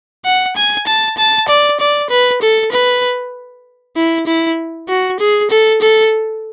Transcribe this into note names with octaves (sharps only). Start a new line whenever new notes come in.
F#5
G#5
A5
A5
D5
D5
B4
A4
B4
E4
E4
F#4
G#4
A4
A4